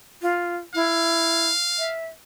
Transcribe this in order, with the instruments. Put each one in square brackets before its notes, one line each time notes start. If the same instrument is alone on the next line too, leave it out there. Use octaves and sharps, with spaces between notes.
[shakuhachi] F4
[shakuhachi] E4 [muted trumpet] F5
[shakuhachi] E5